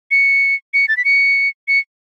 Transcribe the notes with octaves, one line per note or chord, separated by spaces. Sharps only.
C#7
C#7
A6
B6
C#7
C#7